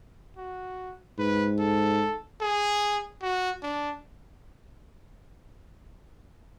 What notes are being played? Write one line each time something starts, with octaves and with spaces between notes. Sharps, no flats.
F#4
G#2 B4
A4
G#4
F#4
D4